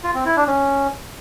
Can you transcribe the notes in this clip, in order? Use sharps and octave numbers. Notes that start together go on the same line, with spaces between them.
F4
C4
E4
D4
C#4